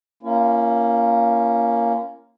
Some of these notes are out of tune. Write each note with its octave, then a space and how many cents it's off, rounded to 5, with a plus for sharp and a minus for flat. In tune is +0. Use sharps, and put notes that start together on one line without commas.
A#3 +0 C#4 +0 E4 +45